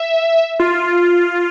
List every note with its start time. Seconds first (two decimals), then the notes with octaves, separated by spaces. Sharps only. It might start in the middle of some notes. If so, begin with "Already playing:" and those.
Already playing: E5
0.60 F4